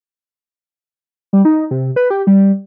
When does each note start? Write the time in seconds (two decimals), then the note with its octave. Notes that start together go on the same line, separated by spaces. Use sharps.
1.33 G3
1.45 D#4
1.71 C3
1.96 B4
2.10 G4
2.27 G3